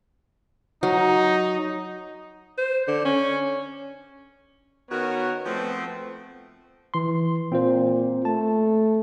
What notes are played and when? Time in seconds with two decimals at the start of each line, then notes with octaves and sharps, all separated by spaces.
0.83 F#3 D#4
2.58 C5
2.88 D3
3.05 C#4
4.90 D#3 B3 C#4 F#4 A#4 C#5
5.45 F3 A3 B3 C4
6.94 E3 C6
7.52 A#2 C4 F4 C5
8.25 A3 A5